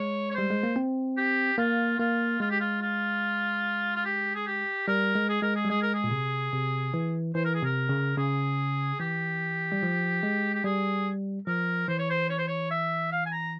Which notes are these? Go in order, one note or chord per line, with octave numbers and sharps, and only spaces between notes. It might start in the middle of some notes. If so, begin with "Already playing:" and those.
Already playing: G#3 C#5
C#5
G3 C5
G#3
A#3
C4
G4
A#3 F4
A#3 F4
G#3 F4
G4
F4
F4
F4
G4
G#4
G4
G3 A#4
G#3
G#4
G#3 A#4
G#4
G3
G#3 G#4
A#4
G#4
A#2
C3
C3
E3
E3 C5
A#4
G#4
C3 A#4
C#3
C#3 G#4
E3 G4
G3
F3
G#3
G4
G3 G#4
F3 A#4
E3 C5
C#5
C5
C#5
C5
C#5
E5
F5
G#5
A#5